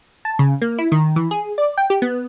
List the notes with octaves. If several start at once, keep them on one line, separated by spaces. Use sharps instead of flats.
A5
C#3
A#3
E4
D#3
E3
G#4
D5
G5
G4
B3